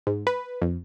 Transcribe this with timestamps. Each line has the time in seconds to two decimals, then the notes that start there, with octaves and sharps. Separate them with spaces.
0.07 G#2
0.27 B4
0.62 F2